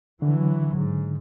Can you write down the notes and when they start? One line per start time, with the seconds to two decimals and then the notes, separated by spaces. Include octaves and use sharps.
0.22 D3 E3 F#3
0.76 G#2